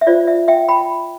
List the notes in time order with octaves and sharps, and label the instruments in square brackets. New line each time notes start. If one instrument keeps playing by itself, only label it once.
[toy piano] E5
F4 C5 D5
E5
E5 G5
G5 B5